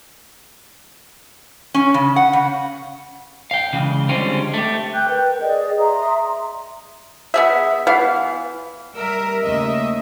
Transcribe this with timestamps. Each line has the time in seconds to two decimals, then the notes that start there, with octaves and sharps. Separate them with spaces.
1.74 C#4
1.94 C#3
2.16 F#5
2.33 C#3
3.51 F5 G5
3.73 C#3 E3 G#3
4.09 D3 G3 G#3 C4 C#4 F4
4.54 A3 G4
4.93 G5 F#6 G6
5.07 A#4 B4 G5
5.40 G#4 D5 D#5
5.79 E5 A#5 C6 D#6
7.34 B3 G#4 E5
7.87 E3 B3 F5
8.94 G3 A#4 E5
9.42 D#2 C#3 A3 D#5 E5